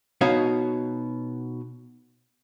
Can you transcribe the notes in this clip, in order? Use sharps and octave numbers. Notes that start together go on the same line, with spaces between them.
B2 B3 D#4 F#4 C#5 F5